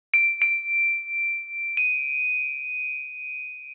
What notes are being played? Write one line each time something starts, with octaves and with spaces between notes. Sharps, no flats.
D7
D7
D#7